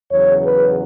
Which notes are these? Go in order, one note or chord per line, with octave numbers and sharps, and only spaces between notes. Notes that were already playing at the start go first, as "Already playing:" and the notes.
E2 C#3 F#3 C#5
B4